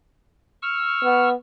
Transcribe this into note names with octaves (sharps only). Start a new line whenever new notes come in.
C#6 E6 F6
B3